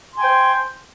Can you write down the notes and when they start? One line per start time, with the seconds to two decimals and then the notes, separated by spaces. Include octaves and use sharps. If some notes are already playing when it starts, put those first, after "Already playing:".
0.13 C6
0.16 G#5
0.19 G5
0.23 C5